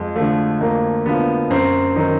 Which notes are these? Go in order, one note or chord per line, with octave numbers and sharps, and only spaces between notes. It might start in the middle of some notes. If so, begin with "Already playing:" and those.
Already playing: F2 G#3
D3 F3 A3
F2 A#3
D3 F3 B3
F#2 C4
D#3 F#3 D#4